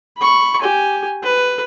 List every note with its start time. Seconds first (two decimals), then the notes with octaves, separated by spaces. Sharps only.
0.18 B5 C#6
0.61 G4 G#5
1.24 B4